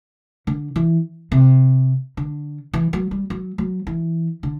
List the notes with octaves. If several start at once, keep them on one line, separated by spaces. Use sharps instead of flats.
D3
E3
C3
D3
E3
F#3
G3
F#3
F#3
E3
D3